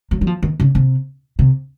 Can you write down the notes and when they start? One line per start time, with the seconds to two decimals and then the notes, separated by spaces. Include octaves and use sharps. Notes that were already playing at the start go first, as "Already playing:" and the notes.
0.11 F#3
0.21 F#3
0.27 F3
0.43 D#3
0.60 C#3
0.75 C3
1.39 C3